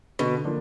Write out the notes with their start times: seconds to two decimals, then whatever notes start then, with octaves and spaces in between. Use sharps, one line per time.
0.19 B2 D3
0.45 F3 A#3 D4 F4